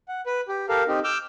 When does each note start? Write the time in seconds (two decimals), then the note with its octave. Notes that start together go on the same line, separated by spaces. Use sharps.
0.08 F#5
0.26 B4
0.48 G4
0.69 G4 A4 A#4 F5
0.88 C4 D#4 G4
1.04 D6 E6 F6 G6